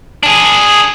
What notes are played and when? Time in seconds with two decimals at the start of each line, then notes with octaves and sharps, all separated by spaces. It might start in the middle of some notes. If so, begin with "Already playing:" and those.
0.23 D4 G#4